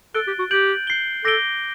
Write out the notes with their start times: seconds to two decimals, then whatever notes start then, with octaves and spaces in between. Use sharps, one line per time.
0.15 A4 F#6 A6 D7 G7
0.27 G4
0.39 F#4
0.51 G4 G6 D7 F#7
0.87 G6 C7 G7
1.25 A4 D6 G6 A#6 D7 G7